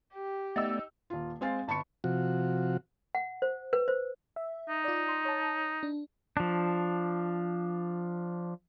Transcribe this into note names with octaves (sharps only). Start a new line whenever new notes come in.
G4
A3 B3 D#4 D5 E6
D#1 F4
G#3 C4 F5 G#5 A6
G1 A5 B5 C#6 C#7
C3 F3 F#4
F#5
C5
B4
C5
E5
D#4
F4 D5
C6
C#5 A5
D4
F3 D4